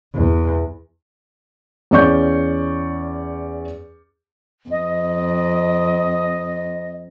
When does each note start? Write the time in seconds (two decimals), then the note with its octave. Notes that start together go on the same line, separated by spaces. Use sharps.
0.15 E2
1.91 E2 C#4 D5 C#6 G6
4.70 F2 D#5